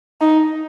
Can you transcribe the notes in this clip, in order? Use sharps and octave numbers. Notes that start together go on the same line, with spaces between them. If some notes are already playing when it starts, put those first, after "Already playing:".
D#4